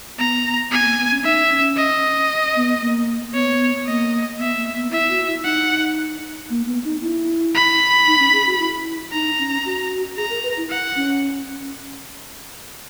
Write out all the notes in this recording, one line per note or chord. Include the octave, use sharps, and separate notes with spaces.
B3 A#5
B3 G#5
A#3
B3
C#4
D#4 E5
C#4
D#5
B3
A#3
B3 C#5
A#3 D#5
B3 E5
A#3
B3
E4 E5
F#4
E4
D#4 F#5
A#3
B3
D#4
E4
B5
D#4
C#4
G#4
F#4
E4
D#4 A#5
C#4
F#4
G#4 A#5
A#4
B4
E4
F#5
C#4